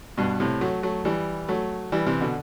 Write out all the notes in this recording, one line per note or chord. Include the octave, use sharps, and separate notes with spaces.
G2 B2
A2 C3
F#3 A3
F#3 A3
E3 G3
F#3 A3
E3 G3
C3 E3
B2 D3